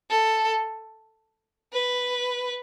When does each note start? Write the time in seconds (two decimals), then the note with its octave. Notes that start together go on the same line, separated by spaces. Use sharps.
0.10 A4
1.74 B4